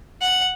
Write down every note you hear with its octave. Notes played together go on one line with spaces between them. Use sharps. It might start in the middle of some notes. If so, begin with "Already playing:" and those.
F#5